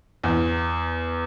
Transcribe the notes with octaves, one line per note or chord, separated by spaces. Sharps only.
E2